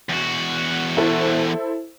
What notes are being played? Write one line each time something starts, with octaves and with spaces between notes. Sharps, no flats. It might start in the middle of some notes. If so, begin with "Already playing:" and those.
E2 F#4
E4 A4 C5